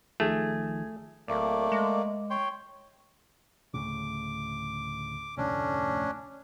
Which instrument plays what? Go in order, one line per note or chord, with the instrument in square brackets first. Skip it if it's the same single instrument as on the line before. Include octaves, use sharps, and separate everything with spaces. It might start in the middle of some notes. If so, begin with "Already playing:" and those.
[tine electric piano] B1 G#6 [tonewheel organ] D#3 F3 [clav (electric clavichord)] A3 [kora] G#4
[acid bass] D1 [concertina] A3 A#3 D5
[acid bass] G#3
[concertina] C#5 G5 C6
[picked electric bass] D2 A2 C#3 [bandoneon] D6
[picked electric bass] F1 D2 A2 [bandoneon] C#4 D4